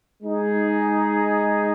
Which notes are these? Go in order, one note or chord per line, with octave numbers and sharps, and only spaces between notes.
G#3 D#4 G#4